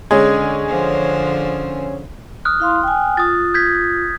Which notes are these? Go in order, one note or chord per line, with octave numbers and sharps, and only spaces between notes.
D3 G#3 C#4 G#4
D3 F3 C5
D#6 F6 F#6
E4 F5 C6
G5 G#5
F4 D#6 A6
G6 G#6 B6